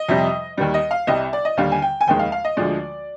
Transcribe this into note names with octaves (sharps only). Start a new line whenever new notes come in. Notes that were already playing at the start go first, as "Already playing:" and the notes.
Already playing: D#5
F2 C3 G3
D#2 D#3 G3
D#5
F5
C2 C3 G3 D#5
D5
D#5
D#2 D3 G3 F5
G#5
G5
G#5
F1 D#2 D#3 G#3 G5
F5
F5
D#5
D2 D3 F3 G#3 D5